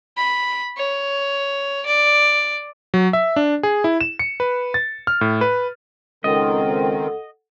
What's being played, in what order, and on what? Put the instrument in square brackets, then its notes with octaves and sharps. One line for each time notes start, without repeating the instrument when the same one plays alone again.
[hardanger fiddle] B5
C#5
D5
[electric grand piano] F#3
E5
D4
G#4
E4
E7
C#7
B4
A6
F6
A2
B4
[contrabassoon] C#2 [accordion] D#3 C4 [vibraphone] A4 F#5 [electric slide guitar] D#5